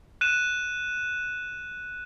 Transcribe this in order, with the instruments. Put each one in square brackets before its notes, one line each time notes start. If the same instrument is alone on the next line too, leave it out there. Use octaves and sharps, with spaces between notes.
[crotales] F#6 D#7 E7